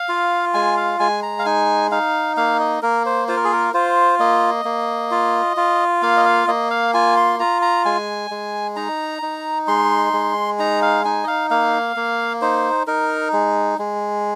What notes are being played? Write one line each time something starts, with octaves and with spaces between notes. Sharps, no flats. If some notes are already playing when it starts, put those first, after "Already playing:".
Already playing: F5
F4
G#3 G#5
F5
G#3 G#5
A#5
F5
D#4 G#5
D#4 F5
A#3 F5
D#5
A#3 A#4
C5
F4 C5
A#4
G#4
A#4
F4 C5
A#3 D#5
A#3
F4
F4
A#3 F5
D#5
F5
A#3 D#5
F5
F4 G#5
C6
F4 A#5
A#5
G#3 G#5
G#3
D#4 A#5
D#4
G#3 C6
G#3
D#4 A#5
F5
D#4 G#5
D#5
F5
A#3 F5
A#3
D#4 C5
D#4 A#4
G#3
G#3